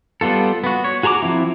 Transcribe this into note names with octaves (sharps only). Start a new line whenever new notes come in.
G3 B3 F4 A4
B3 F#4
C#5
F#4 G#4 A#5 C6 D6
F3 C4 E4